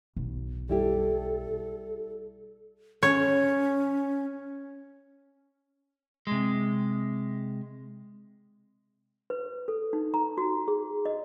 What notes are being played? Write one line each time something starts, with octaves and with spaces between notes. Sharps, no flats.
B1
G3 E4 G4 A4
C#4 C#5
C3 G#3
B4
A4
D#4
A#5
F#4
G#4
D#5